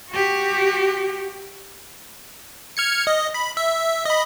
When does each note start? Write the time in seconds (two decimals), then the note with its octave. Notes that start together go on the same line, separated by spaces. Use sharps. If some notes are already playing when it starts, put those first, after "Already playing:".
0.11 F#4 G4
2.77 F6 G#6 C#7
3.07 D#5
3.34 B5
3.57 E5
4.05 D#5 B5